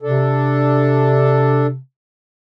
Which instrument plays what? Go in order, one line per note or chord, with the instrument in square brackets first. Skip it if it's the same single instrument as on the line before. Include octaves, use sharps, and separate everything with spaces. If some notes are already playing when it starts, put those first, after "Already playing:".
[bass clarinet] C3 [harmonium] D4 A4